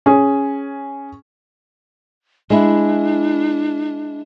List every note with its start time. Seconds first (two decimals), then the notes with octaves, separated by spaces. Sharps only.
0.06 C#4 G#4
2.50 G#3 D4 E4